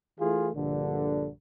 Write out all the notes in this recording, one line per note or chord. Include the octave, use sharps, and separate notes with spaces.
E3 A3 E4 F4 G#4
A#1 G2 D3